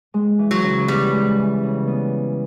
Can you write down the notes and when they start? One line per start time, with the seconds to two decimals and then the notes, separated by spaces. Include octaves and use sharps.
0.14 G#3
0.39 E3
0.51 F#3
0.64 C#3
0.88 G3 B3
1.13 G#3
1.38 E3
1.63 C#3
1.87 B3